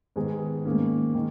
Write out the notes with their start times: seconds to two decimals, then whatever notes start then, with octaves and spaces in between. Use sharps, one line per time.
0.16 G#2 D#3 G#3 B3 G#5
0.65 G#2 D#3 A#3 C#4
1.15 D#3